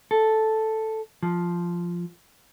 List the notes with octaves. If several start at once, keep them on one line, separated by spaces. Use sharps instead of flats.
A4
F3